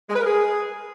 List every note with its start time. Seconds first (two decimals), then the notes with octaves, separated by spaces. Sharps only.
0.10 G#3
0.15 B4
0.21 A#4
0.26 G#4